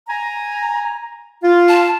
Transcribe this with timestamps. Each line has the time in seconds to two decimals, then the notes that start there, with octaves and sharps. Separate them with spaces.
0.07 G#5 A#5
1.42 F4
1.69 A5